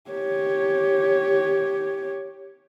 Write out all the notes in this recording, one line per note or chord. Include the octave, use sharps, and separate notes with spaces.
G4 C#5